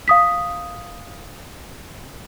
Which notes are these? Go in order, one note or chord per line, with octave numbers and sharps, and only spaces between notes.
F5 D#6 B6